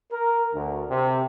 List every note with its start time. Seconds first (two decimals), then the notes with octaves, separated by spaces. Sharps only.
0.12 A#4
0.53 D2
0.90 C3